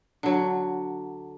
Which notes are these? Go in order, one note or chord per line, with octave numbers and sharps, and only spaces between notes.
D3 F#3